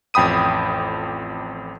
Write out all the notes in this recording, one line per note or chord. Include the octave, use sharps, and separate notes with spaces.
A1 F2 G5 B5 D#6 D#7